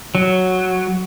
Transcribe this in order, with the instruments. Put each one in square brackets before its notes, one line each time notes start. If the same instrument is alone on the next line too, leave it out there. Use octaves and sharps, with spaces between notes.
[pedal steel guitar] F#3